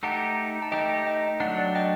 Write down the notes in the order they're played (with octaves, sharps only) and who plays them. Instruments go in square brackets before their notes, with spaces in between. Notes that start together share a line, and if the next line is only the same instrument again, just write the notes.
[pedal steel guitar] A3 D#4 G4 [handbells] F#5 A5
[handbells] A5
[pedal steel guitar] A3 D#4 G4 [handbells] D#5 G5
[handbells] D#5 G5
[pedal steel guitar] F#3 A3 D4 [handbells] D5 F#5
[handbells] D5 F#5
D#5 G5